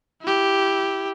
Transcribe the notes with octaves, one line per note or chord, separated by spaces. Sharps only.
E4 G4